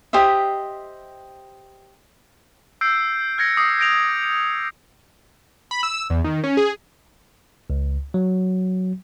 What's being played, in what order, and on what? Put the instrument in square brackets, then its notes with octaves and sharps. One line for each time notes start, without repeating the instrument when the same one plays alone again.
[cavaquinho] G4 C5 D#5 E5
[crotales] E6 G6 C7 D7
F6 G#6 A#6 C#7
D6 D#6 C7
G6 A#6 D7 F7
D7
[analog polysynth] B5
E6
E2
D#3
C#4
G#4
[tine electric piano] C#2
F#3